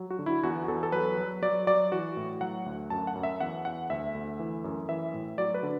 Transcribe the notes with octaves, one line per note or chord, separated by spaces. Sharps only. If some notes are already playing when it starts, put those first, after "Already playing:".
Already playing: F#3
F#4
D3
E4
E2 F#4
E2 A4
A4
F#3 B4
F#3
F#3 D5
F#3 D5
E3 F#4
A2
F#3 F#5
D2
F#2 A5
F#5
F#2
E5
E2 F#5
E2 F#5
D2 E5
D2
E3
F#2
E3 E5
A2
F#3 D5
B4
D3